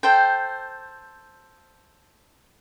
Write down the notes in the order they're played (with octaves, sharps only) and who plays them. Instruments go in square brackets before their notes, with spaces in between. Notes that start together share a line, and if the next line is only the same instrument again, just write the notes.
[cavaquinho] A4 C5 G5